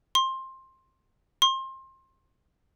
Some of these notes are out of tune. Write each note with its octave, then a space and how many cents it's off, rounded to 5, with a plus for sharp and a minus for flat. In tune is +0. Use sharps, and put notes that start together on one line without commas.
C6 +15
C6 +25